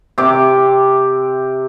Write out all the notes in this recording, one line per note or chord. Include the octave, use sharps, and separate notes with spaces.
C3 D6